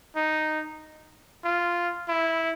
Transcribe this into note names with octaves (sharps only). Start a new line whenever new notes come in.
D#4
F4
E4